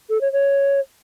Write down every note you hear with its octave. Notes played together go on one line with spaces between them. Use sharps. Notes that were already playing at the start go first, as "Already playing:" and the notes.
A4
C#5
C#5